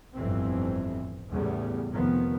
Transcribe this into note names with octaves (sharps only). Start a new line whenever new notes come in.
G1 F2 A2 E3 C4
E2 A2 C#3 G3 B3
F1 D#3 F3 B3